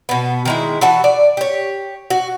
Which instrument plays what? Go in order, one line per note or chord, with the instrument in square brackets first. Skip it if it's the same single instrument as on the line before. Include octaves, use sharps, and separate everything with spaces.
[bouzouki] B2 B3
D#3 G#3 E4
E3 F#4 F#5 A5
D5
G4 C#5
F#4